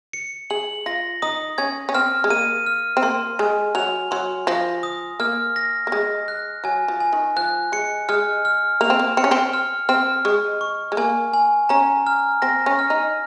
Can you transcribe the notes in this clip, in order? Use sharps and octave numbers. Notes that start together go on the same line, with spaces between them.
C#7
G#4 F#7
F4 A#6
D#4 D#6
C#4 G#6
C#4
C4 F6
G#3
A#3 D#7
F6
C4
A#3 C6
G#3 G#5
F#3 F7
F#3 C6
F3 A#6
D#6
A#3 F6
A#6
A#3
G#3 A#6
F#6
F#3 G#5
F3
G#5
D#3
F3 F#6
G#3 C#7
G#3 F6
F6
A#3 F7
C4
A#3
C4 C#7
C#4
C4
F6
C4 F6
G#3 C#6
C#6
G#3
A#3 G#5
G#5
C#4 A#5
F6
C4 A#6
C#4
F6
D#4